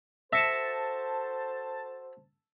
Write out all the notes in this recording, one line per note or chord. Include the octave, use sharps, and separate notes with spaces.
F#4 A4 C5 E5 A5 A#6 C#7 E7